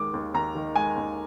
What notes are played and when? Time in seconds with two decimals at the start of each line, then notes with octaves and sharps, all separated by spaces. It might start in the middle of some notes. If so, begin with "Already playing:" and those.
Already playing: D#2 D#3 G#3 D6
0.14 D#2
0.34 D#2 A#5
0.55 D#3
0.76 G#3 G#5
0.96 D#2